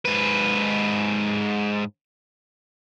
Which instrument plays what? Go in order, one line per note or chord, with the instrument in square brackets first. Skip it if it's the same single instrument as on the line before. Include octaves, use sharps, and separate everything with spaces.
[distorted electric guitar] G#2 B4